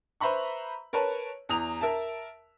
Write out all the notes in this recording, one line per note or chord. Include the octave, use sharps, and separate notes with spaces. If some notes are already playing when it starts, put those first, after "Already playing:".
B4 C5 E5 A#5 B5 C#6
A#4 B4 C#5 A5
E2 A#5 D#6 F7
A#4 E5 A5